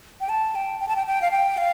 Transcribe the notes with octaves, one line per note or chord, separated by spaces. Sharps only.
G5
A5
G5
G5
A5
G5
G5
F5
G5
F5